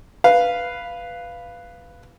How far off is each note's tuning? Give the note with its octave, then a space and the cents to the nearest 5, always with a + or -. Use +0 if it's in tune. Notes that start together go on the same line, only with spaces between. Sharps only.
B4 +0 F5 -5